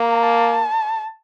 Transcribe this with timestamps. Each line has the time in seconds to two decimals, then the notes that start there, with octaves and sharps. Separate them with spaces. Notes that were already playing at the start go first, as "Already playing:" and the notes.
Already playing: A#3 A#5
0.23 A5